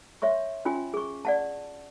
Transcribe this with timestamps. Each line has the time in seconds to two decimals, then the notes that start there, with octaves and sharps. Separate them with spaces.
0.22 C#5 E5 C6 C#6
0.65 C#4 F4 G5 G#5 C6
0.94 G#4 C#6
1.25 D5 F#5 A5